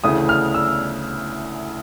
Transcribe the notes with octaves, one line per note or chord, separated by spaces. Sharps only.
D2 C#3 E3 D#6
F6
E6